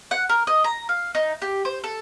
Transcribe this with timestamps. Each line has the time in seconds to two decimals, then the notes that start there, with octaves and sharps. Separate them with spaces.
0.11 F#5
0.29 A#4
0.47 D#5
0.64 A#5
0.89 F5
1.15 D#4
1.42 G4
1.65 C5
1.84 A4